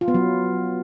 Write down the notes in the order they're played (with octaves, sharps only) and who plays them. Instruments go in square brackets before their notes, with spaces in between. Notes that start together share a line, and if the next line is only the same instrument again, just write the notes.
[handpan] F4
B3
F#3